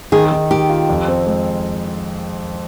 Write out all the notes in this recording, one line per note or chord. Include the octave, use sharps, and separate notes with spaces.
D#3 G#4
D#3
D#3 G4
F4
F2
C4
G#3